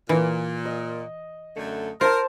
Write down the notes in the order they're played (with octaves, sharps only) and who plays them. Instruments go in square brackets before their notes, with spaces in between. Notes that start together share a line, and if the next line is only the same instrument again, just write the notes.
[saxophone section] A#2 [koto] E3
[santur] D#5
[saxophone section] F#2 D3 A3
[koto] F4 [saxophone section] A#4 [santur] C5 A5